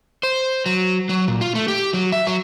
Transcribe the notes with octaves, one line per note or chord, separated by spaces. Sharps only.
C5
F#3
F#3
A#2
F4
A3
G4
F#3
E5
F#3